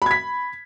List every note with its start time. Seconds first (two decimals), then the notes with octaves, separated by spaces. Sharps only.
0.02 B5
0.06 G#6
0.11 B6